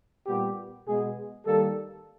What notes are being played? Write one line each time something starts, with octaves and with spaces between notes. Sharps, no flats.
A#2 G3 B3 G4
B2 G#3 B3 G#4
D#3 G3 A#3 A4